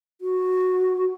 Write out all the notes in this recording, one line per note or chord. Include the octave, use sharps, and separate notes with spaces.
F#4